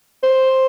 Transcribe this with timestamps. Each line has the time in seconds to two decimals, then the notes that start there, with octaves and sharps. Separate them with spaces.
0.23 C5